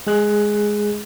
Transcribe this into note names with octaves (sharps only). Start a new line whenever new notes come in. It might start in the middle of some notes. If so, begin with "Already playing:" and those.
G#3 G#4 F#6